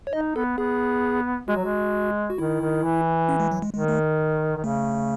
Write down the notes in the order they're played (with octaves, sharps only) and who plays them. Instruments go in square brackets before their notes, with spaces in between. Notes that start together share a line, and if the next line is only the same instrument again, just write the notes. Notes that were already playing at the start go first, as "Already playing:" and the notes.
[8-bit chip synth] C#5
[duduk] D#4 [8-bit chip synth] D#5
[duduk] B3 [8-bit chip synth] A4
[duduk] B3 [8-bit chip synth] G#4
[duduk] G#3 [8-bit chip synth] F#4
[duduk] F#3
G#3
[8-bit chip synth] F#4
[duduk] D#3 [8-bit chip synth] E4
[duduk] D#3
E3
[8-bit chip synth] C#4
G#3
F#3
G#3
[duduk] D#3 [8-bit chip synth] G#3
[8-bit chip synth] A3
[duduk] D#3
[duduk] C#3 [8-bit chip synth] A3